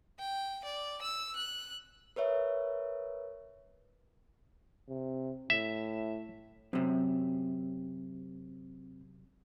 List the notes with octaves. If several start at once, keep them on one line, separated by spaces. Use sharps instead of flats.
G5
D5
E6
F#6
A#4 B4 C#5 E5
C3
A2 E5
F#2 C3 C4